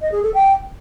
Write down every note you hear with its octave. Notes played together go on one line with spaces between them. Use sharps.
D#5
G#4
A4
G5